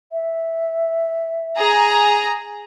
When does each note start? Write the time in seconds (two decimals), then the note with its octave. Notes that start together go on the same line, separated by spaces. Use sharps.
0.12 E5
1.57 G#4 A#5